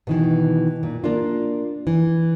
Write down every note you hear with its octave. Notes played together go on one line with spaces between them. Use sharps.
B2 D#3 E3
A#2
A#3 D4 F4
E3